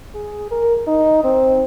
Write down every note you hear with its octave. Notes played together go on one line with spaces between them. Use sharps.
G#4
A#4
D#4
C4